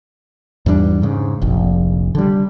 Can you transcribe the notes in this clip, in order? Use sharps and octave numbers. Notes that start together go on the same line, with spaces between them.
E2 G#2 G3 D4
G#2 C#3
F1 A#1
D3 G3